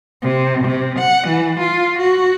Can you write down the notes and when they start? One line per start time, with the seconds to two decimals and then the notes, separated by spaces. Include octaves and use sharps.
0.22 C3
0.64 C3
0.99 F#5
1.28 E3
1.60 F4
1.99 F#4